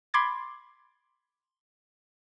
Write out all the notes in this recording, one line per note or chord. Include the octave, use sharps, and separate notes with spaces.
B5 C6 D6 G#6 A6